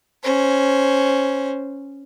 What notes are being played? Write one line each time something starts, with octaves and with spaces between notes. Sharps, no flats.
C#4 C5